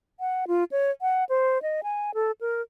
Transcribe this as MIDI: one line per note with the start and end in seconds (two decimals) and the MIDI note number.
0.20 0.45 78
0.48 0.64 65
0.71 0.91 73
1.01 1.24 78
1.29 1.61 72
1.62 1.81 75
1.83 2.11 80
2.14 2.31 69
2.41 2.62 70